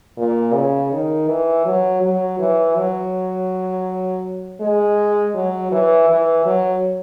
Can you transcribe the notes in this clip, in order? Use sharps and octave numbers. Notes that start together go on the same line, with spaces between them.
A#2
C#3
D#3
E3
F#3
F#3
E3
F#3
G#3
F#3
E3
E3
F#3